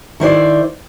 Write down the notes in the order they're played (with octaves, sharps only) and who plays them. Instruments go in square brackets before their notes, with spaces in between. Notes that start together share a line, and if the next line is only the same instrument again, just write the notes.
[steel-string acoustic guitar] D#3 E4 C5 D5